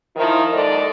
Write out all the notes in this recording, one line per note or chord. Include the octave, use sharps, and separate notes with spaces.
D#3 F3 E4
D#2 G#2 A4 D5 D#5